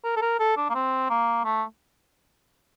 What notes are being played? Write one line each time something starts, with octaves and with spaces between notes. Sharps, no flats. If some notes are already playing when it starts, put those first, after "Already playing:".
A#4
A4
A#4
A4
D4
A#3
C4
A#3
A3